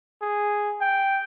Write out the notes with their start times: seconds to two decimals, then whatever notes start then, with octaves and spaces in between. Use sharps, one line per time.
0.22 G#4
0.81 G5